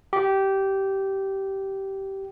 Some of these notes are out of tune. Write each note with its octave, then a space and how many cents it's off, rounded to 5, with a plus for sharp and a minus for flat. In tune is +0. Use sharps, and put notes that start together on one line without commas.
G4 -15